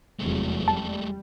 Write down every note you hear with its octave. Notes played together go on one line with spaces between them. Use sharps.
F1 E2 F#3 G#3 A3
G3 A5